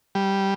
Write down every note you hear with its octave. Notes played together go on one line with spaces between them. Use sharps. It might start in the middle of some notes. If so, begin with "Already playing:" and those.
G3